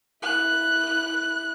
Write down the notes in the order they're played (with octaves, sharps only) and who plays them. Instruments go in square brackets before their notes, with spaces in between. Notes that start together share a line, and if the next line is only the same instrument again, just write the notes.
[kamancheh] E4 F#6